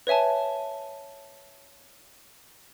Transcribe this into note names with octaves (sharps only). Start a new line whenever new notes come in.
B4 C#5 E5 G#5 A5